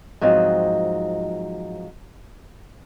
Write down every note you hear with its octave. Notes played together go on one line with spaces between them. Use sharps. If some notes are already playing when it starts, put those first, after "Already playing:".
G#2 F3 F#3 C4 D#5